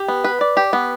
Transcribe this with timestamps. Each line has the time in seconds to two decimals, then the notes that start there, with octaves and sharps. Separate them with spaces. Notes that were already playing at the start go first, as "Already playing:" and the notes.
Already playing: G4
0.08 B3
0.24 B4
0.41 D5
0.57 G4
0.73 B3